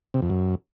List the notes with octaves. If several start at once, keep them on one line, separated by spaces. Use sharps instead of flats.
C3
F2
F#2